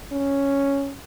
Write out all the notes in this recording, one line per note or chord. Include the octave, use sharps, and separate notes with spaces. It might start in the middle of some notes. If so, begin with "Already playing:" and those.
C#4